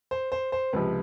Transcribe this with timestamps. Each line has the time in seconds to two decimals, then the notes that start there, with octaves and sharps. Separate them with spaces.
0.11 C5
0.32 C5
0.52 C5
0.73 C#2 C3 F3 B4